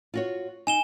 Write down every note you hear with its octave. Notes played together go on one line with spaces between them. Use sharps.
F4 F#4 C#5
D#4 G#5 E7 G7